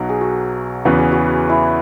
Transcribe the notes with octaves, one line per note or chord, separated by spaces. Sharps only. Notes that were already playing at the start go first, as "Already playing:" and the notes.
Already playing: B1 B2 F#3
G#4
F#4
E2 C#3 E3 B3 F#4
G#4
F#4
E4